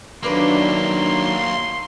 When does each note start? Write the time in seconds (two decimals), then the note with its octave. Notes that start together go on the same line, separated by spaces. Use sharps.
0.23 D#3 F#3 G3 A3 A#3 D4 B4 C6